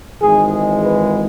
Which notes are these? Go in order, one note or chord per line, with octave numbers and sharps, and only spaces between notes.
G#1 G#2 E3 G#3 G#4
G#4
B4